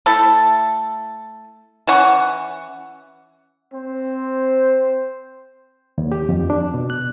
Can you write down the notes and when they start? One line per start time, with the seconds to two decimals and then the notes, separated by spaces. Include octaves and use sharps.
0.06 A3 E4 A4
1.87 E3 C#4 F#5 C#6
3.74 C4 C5
5.98 D#2
6.12 G4
6.29 F2
6.50 D4
6.74 B2
6.90 F#6